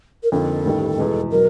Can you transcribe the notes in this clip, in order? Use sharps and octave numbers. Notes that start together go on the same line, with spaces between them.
A#4
F2 D3 F3 A#3 D#4 A4
A1 G2 D#3 G3
E2 B2 G#3
B2 F#3 A#4